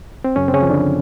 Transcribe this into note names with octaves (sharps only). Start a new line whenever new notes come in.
C4
F#2 C#3 C#4
C4
C#3 C#4
F3
D3 D4